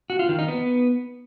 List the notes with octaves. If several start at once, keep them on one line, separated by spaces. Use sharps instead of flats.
F#4
F4
D#3
D#4
B3